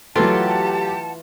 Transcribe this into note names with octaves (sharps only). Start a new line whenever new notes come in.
E3 F#3 A3 F4 G4 F#5 A5